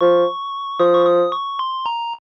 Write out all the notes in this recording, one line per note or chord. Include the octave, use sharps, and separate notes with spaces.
F3 C#6
F3 D#6
C#6
D#6
C#6
C6
A#5